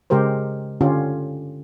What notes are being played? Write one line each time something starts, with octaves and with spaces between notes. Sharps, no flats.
C#3 G#3 G4 A#4 C5
D3 C#4 F4 G4